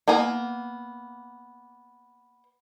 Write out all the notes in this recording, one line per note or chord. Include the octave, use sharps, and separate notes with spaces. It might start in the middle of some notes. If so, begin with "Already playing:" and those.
A#3 B3 G#5 A#5